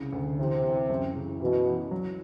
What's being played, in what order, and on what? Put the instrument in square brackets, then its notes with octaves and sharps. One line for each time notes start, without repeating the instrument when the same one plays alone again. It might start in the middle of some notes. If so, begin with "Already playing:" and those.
Already playing: [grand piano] C2 C#3
D2
[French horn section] C3 [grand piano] E3
[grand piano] E3
F#2
C#3
[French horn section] B2 [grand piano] E3
[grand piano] E3
F#3